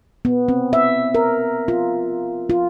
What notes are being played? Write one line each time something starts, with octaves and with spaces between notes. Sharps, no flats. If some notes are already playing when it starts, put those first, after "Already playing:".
B3
C4
E5
A#4
F4
F4